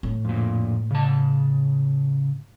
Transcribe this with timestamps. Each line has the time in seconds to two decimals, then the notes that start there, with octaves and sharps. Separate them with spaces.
0.03 A2
0.25 F2 A#2
0.91 C#3 A5